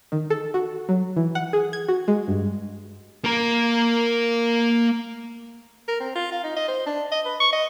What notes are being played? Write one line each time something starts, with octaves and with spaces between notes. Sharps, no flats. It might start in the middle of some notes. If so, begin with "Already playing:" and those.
D#3
A4
F#4
F#3
E3
F#5
G#4
G#6
F#4
G#3
G2
A#3 A#4
A#4
C4
F4
F5
D#4
D#5
C5
D4
D#5
B4
C#6
D#5